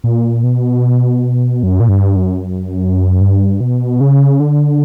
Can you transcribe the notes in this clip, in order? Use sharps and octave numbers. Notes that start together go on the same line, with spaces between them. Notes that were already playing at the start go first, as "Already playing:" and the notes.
A#2
B2
F#2
A#2
G2
F#2
G2
B2
C#3
D3